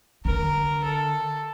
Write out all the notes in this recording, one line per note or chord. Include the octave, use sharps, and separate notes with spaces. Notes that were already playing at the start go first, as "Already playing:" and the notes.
D3 A#4
A4